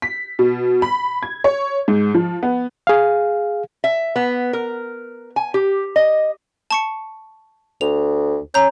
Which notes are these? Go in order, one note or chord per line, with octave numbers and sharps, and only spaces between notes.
B6
B2
B5
G#6
C#5
G#2
F3
B3
G#4 F5
E5
B3
A#4
G#5
G4
D#5
A5 C#6 C#7
D2 F7
C#4 A#5 G6